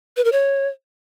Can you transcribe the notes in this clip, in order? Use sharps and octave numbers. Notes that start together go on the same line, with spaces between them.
B4
A#4
C#5